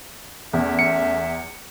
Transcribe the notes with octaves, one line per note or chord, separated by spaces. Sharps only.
E2 A3 C#4 E5
C#7